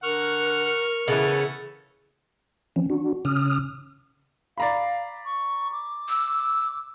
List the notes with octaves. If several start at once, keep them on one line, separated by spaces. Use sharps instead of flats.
D3 A#4 F#5 C#6 F6
C#3 E3 B3 A4
E3 F3 C4 C#4
D4 F#4
C#3 C#4 D#6 F6
D5 F5 A#5 B5
C#6
D6
E6